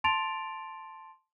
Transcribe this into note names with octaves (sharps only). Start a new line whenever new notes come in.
A5 C6 A6 D7 F7